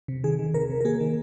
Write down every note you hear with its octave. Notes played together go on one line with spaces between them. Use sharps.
C3
D#3 G#4
D#3
C3 A#4
C3
A#4
A#3 G#4
D#3